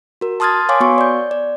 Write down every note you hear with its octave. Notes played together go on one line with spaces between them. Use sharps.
F#4 A#4
A5 C6 D#6 F6 G#6 A6
C#5 F5 G#5 C6 D6
B3 F#4 C#6
D5 G6
D5